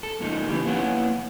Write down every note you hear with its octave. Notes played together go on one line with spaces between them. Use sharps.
A4
G#2 C#3 F3 A#3 D#4
E3 C#4 E4 G4
A#3 B3 C#4 E4 F#5